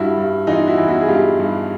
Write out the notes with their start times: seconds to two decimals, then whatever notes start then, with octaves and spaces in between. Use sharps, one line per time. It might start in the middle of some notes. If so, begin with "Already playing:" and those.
Already playing: G2 E4 F#4
0.17 G2
0.47 E3 D#4 F4
0.67 E4 F#4
0.77 E3
0.88 E4 F#4
1.01 G#4
1.08 G2 F4 G4
1.39 G2